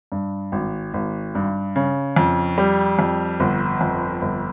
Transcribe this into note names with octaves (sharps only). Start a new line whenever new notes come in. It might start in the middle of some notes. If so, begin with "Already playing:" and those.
G2
G#1
G#1
G2
C#3
F2
G3
F2
G1
F2
G1